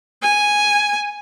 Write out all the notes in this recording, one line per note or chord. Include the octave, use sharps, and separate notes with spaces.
G#5